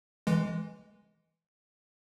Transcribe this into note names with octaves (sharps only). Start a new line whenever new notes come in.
E3 G#3